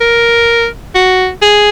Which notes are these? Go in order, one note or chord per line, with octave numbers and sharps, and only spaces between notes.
A#4
F#4
G#4